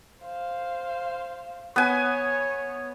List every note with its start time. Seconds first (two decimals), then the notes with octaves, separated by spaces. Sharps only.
0.24 C5 F5
1.76 B3 C#5 G#5